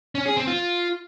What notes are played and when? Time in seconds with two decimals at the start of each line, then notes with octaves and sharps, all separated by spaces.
0.15 C#4
0.26 G#4
0.36 C4
0.47 F4